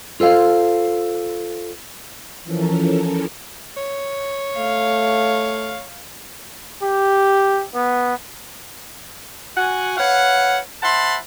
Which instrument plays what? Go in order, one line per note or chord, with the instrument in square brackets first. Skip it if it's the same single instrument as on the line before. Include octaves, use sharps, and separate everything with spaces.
[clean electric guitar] F4 A4 C5 F5
[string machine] E3 F3 C#4 A4 A#4
[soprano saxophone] C#5
[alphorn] A3 [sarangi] F5
[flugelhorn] G4
B3
[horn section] F#4 F#5 G#5
B4 C#5 F5 F#5
C5 E5 F#5 A5 B5 C6